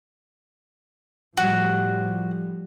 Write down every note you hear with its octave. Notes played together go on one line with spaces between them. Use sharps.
A2 F3 G3 F#4